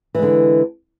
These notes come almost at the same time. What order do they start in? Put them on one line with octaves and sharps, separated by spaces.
E3 G#3 D3